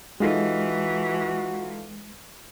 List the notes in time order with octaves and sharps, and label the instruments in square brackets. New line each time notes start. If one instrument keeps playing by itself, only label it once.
[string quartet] E3 [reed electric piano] G#3 [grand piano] D#4 F4 A4 [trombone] F#4